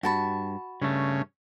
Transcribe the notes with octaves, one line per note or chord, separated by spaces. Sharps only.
G2 F#4 A5 B5
G2 C#3 A3